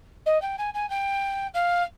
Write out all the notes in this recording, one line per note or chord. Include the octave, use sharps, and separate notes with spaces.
D#5
G5
G#5
G#5
G5
F5